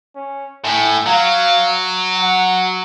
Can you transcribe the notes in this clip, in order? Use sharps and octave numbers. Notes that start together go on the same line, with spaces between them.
C#4
A2 G#5
F#3 F5
F#5